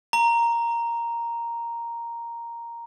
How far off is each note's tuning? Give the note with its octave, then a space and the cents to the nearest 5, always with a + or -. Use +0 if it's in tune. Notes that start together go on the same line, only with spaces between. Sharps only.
A#5 +0